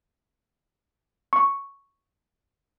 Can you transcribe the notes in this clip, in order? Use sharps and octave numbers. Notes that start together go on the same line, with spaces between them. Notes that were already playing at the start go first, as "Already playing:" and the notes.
C#6